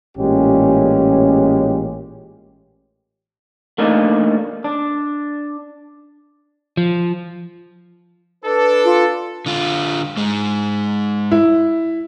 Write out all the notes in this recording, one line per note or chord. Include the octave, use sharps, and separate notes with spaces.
A1 A#2 G#3 C#4 G4
A3 A#3 D4 D#4 F4
D4
F3
D4 A4 B4
F4
D3 F4
G#2 G#3
E4